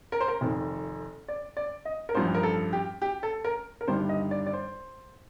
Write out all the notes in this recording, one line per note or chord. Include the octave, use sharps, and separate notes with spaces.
A#4
C5
A#4
F1 F2 D#3
D5
D5
D#5
A#4
A1 G2 F3 C5
A#4
A4
G4
G4
A4
A#4
A#4
G1 G2 D#3 G3 C5
D#5
D5
D5
C5